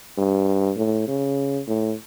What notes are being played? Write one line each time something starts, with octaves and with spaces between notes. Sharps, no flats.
G2
A2
C#3
A2